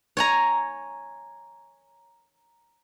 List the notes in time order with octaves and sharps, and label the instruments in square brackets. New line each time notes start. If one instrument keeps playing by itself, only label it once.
[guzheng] C#5 G#5 A#5